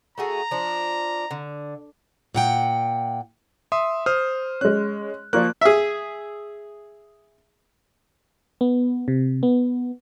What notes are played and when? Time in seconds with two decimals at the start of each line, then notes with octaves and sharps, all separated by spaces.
0.18 A3 F#4 G#4 A#5
0.51 F3 D4
1.31 D3
2.35 A#2 F#5 G5
3.72 E5 C6 D#6
4.06 C5 D#6 F6
4.61 G#3 C#4 F#6
5.33 F3 A#3 F4 D5 C#6 F#6
5.61 G#4 E5
8.61 B3
9.08 C3
9.43 B3